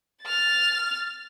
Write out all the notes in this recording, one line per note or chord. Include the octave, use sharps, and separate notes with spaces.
F6 A6